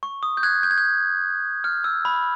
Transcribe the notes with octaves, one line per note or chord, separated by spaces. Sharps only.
C#6
D#6
G6
F#6 G#6
G6
G#6
G6
F6
E6
B5